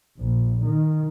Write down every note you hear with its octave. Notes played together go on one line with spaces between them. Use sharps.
A#1
D#3